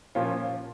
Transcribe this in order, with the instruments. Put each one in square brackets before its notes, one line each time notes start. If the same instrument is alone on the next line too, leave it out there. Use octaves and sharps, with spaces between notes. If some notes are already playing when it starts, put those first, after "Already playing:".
[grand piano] A#2 F3 A#3 C#4 F4